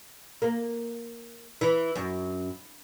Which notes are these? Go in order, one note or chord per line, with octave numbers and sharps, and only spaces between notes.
A#3
E3
F#2